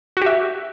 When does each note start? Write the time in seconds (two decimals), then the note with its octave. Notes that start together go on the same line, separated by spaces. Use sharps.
0.17 F#4
0.22 G4
0.26 E5